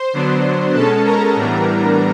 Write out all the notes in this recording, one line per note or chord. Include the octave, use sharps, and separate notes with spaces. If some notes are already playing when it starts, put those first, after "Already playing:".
Already playing: C5 C6
D3 F#3 B3 D4
B2 G#3 C#4 A4 A5
A#4 A#5
A2 E3 G3 B3 D4